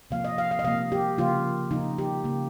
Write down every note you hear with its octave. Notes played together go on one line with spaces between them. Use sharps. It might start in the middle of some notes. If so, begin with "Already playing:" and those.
C3 F3 A#3 F5
D#5
F5
F5
D#5
C3 F3 A#3 F5
G4
C#3 F3 A#3 F4
C#3 F3 A#3 D#4
G4
C#3 F3 A#3